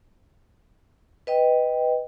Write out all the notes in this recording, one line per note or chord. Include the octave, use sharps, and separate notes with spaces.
B4 D#5 G5